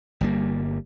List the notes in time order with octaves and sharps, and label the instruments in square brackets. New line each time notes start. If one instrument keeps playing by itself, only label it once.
[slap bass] G1 G3 A#3